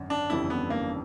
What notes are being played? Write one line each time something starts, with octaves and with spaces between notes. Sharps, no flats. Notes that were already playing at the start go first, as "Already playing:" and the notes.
Already playing: G#1 F#2 D3
D4
G1 F2 C#3 E3 G3 E4
B3
A#3